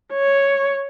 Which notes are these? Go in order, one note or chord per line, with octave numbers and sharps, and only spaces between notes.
C#5